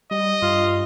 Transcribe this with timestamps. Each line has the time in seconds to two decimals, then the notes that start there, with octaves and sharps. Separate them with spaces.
0.11 G3 D#5
0.42 G2 F4